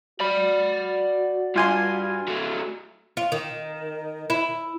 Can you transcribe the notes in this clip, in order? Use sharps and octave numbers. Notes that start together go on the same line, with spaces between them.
F#4 D5 B5
G2 F4 G#5 C6
F#3 A3
F4
D#3
E4